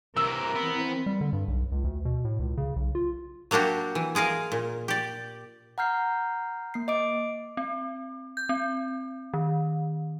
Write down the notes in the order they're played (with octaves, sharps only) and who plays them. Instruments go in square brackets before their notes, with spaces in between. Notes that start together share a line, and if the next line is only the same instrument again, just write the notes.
[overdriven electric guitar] C3 E3 [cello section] A#4 [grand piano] E6
[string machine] E3 C4 [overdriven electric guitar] B3
[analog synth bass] G3
D3
G2
B1
C#2
D2
B2
A2
C#2
C#3
B1
F4
[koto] F#3 A#3 D4 F#4 G4
E3
G#3 G#4 A#4 F5
A#2
G4 D5
[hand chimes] F#5 A#5 F6 G6 C7
A#3 C7
D#5 D6 D7
[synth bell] C4
G6
C4
D#3